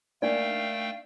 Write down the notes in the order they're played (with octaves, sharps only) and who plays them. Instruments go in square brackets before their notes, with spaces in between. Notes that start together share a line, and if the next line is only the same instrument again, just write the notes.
[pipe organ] A3 G5 [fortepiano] A#3 [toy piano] D4 D#4 D5 [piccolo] F5